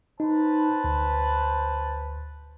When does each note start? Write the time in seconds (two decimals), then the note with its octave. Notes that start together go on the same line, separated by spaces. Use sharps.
0.20 D#4 B4 C5 A5
0.84 D2